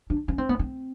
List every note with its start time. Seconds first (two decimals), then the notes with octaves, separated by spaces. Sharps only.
0.10 D4
0.28 C#4
0.38 C4
0.49 B3
0.59 C4